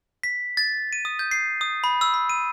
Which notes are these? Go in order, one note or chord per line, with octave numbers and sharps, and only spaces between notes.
B6
A6
D#7
D#6
G6
C7
D#6
B5
E6
B5
D#7